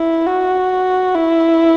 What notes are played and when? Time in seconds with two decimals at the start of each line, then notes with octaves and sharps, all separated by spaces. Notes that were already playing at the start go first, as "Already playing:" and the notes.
Already playing: E4
0.26 F#4
1.15 E4